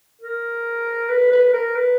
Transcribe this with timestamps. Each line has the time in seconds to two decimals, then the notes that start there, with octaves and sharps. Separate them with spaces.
0.22 A#4
1.10 B4
1.32 B4
1.53 A#4
1.76 B4